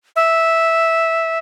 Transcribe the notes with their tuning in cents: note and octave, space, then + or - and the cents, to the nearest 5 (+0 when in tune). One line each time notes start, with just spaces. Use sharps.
E5 -5